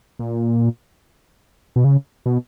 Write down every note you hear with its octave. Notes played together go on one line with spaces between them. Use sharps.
A#2
B2
C#3
B2